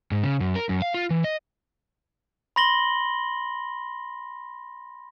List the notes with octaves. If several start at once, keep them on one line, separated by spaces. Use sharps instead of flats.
G#2
C#3
F#2
A#4
F#2
F5
F4
E3
D#5
B5 C6 A#6 F#7 G7